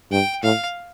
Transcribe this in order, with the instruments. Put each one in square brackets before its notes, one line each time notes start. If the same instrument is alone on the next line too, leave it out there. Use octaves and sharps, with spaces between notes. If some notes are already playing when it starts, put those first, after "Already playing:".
[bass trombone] G2 [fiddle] G5
[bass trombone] A2 [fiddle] F5